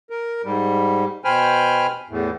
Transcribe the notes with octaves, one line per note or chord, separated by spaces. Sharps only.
A#4
G#2 G3
B2 C5 G5 G#5 B5 F6
E2 A2